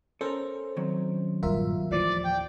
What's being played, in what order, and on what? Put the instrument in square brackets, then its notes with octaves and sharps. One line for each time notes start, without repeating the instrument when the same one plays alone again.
[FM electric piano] C#4 C5 [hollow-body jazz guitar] A4 A#4 A#5
[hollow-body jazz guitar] D#3 F#3 C4
[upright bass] G2 A#2 [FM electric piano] F4 A#4 E5
[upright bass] D#2 [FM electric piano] A2 E3 F3 [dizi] D5
[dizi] G5